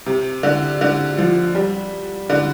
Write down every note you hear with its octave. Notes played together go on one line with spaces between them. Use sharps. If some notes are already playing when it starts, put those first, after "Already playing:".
C3
D3
D3
F3
G3
D3